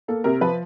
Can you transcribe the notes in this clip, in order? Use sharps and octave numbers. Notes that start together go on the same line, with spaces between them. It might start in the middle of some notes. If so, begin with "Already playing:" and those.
A#3 A4
C3 A#4
F3 B4